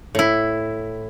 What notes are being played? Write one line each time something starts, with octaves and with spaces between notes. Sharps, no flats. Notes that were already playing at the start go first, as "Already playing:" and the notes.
A2 E4